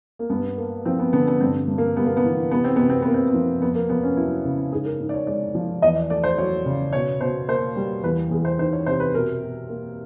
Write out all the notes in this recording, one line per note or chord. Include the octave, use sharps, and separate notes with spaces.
A#3
G2 B3
A#3
F3 C4
B3
D3 B3
B3
G2 C4
G2
A#3
G3 B3
A#3
B3
E3
C3 B3
C4
C3 B3
C4
A#3 B3
C4
B3
F3
F2 B3
A#3
F2 B3
C#4
F#3 E4
C#3
G#2 G#4
A#4
G#2
D5
C#5
G#3 D5
F3
E2 D#5
D5
A3 D5
C5
F#3 C#5
C#3
B2 C#5
B2 C5
A#3 C5
G3
E2 B4
E2 G#4
C5
D#3 C5
C#5
C3 C5
B4
B2 A#4
B2
A#3